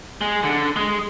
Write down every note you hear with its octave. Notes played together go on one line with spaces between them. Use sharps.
G#3
D3
G#3